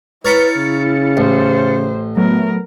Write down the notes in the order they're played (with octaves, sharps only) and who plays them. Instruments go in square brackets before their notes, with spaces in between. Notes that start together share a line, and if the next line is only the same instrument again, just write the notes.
[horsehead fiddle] E4 [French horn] B4 [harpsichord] C#5 A#5 B5 [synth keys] F6 A6 C#7
[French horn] C#3
[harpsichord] A1 [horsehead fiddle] C5
[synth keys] F#3 A3 B3 [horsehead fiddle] A#4